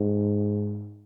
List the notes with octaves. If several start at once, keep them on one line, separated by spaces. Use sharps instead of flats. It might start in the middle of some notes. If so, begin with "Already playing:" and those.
Already playing: G#2